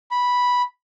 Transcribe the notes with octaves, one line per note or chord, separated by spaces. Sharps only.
B5